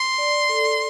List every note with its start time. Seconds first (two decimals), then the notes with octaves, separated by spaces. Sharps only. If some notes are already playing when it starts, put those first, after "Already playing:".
Already playing: C6
0.18 D5
0.49 A4